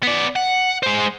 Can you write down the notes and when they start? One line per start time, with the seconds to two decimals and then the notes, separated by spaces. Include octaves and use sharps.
0.03 B3 D5
0.36 F#5
0.83 G#3 C5